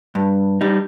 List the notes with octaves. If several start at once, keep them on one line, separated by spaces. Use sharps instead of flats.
G2
G3 D#4